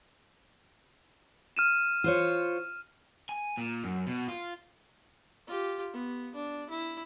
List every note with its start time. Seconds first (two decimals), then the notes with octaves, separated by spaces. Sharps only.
1.57 F6 D#7 E7
2.04 F4 C5 C#5
3.29 G#5
3.57 A#2
3.84 F#2
4.07 B2
4.28 F4
5.47 F4 G4
5.93 B3
6.35 D4
6.70 E4